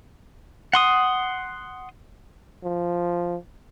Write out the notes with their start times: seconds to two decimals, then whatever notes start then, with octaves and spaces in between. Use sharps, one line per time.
0.73 F#5 C6 D#6
2.63 F3